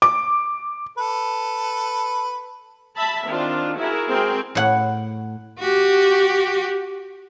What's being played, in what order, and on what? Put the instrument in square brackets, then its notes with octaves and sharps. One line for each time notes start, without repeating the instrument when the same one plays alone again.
[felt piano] D6
[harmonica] A4 B4
[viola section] E5 A5 B5
D#3 C4 D4 F4
E4 F#4 G#4 A#4
G#3 C4 F#4 G#4 A#4 G5
[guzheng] A2 F#5
[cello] F#4 G4